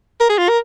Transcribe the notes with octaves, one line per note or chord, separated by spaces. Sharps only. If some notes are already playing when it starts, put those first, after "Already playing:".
A#4
G#4
F4
A#4